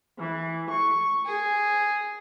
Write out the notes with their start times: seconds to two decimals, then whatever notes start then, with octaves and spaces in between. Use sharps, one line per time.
0.19 E3
0.71 C#6
1.26 G#4